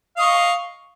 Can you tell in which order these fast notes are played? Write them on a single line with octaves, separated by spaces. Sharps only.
F5 D#5 C#6